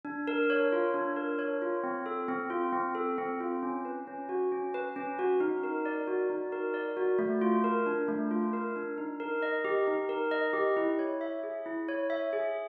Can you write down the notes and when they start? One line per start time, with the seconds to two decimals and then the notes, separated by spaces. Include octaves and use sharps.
0.05 D4
0.27 A#4
0.50 C#5
0.72 F4
0.94 D4
1.16 A#4
1.39 C#5
1.62 F4
1.84 C4
2.06 A4
2.28 C4
2.50 F4
2.73 C4
2.95 A4
3.18 C4
3.40 F4
3.63 C#4
3.85 B4
4.07 C#4
4.29 F#4
4.52 C#4
4.74 B4
4.96 C#4
5.19 F#4
5.40 D#4
5.63 A#4
5.86 D5
6.08 F#4
6.30 D#4
6.52 A#4
6.74 D5
6.97 F#4
7.19 A3
7.41 F4
7.64 A#4
7.86 D4
8.08 A3
8.31 F4
8.53 A#4
8.76 D4
8.98 D#4
9.20 A#4
9.42 D#5
9.65 G4
9.87 D#4
10.09 A#4
10.31 D#5
10.53 G4
10.77 E4
10.99 C#5
11.21 E5
11.43 G#4
11.66 E4
11.88 C#5
12.10 E5
12.33 G#4